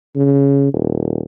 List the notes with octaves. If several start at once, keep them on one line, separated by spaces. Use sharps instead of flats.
C#3
D#1